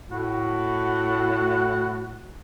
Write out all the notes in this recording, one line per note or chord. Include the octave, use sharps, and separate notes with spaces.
A2 F#4